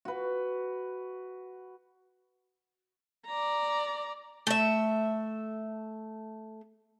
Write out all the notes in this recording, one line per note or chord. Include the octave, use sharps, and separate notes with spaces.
F#4 B4
D5 A#5
A3 E5